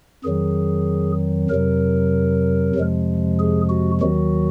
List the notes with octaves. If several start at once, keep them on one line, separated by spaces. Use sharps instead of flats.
F2 D#3 F#3 G#4
F2 C3 F#3 A#4
F2 C3 F3 G#3
G#4
F#4
D#2 D#3 F#3 F#4